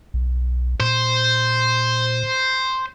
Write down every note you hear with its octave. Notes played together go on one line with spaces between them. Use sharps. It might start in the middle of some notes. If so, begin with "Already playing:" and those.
B1
A#2 C5